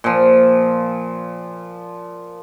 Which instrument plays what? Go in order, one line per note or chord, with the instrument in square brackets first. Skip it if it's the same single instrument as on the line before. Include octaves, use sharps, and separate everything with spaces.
[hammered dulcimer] A#2 F3